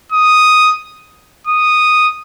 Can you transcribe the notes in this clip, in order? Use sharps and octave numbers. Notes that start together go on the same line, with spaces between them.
D#6
D#6